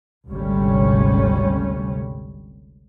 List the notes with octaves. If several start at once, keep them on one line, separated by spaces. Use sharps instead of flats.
G#1 D2 C3 G3 C#4